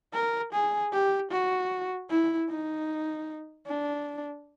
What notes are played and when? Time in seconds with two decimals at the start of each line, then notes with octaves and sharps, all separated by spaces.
0.14 A#4
0.53 G#4
0.92 G4
1.31 F#4
2.10 E4
2.50 D#4
3.67 D4